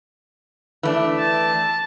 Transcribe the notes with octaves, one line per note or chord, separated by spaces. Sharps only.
E3 A3 D4
A5